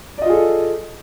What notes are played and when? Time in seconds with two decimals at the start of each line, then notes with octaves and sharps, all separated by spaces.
0.18 D5
0.22 D#5
0.26 F4
0.29 G#4
0.33 A4